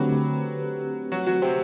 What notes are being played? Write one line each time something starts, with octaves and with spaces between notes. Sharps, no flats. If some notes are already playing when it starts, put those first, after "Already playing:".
Already playing: D3 F#3 A3 C4 F#4 G4 B4
F#3 F#4
F#3 F#4
C3 C4